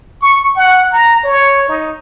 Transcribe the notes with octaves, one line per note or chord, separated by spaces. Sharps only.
C#6
F#5
A#5
C#5
D#4